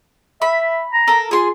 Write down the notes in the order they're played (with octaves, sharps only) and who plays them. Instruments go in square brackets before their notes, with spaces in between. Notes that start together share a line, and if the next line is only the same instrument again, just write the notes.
[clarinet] E5 [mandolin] B5
[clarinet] A#5
[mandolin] A4 A#4
[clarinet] F4 [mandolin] G#4 C6